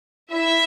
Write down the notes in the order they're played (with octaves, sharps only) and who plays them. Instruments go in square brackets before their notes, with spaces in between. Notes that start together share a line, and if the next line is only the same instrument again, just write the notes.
[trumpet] E4 [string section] E5